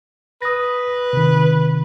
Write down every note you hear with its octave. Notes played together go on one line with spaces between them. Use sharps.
B4 D#6 A#6
C3 D#3